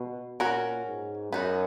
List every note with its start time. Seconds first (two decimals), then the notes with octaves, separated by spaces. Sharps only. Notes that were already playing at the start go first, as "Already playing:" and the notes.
Already playing: B2
0.40 A#2 C#4 F#4 A#4
0.86 G#2
1.32 F#2 B3 D#4 F#4